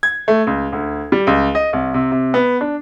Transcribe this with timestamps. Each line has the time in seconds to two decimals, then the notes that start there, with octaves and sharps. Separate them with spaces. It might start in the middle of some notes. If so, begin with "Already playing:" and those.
0.03 G#6
0.28 A3
0.47 C#2
0.72 D2
1.12 G3
1.27 C#2
1.55 D#5
1.73 C2
1.94 C3
2.12 C3
2.34 B3
2.61 D4